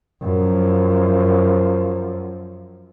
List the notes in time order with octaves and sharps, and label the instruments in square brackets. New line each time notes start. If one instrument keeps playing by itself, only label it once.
[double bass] F#2 F3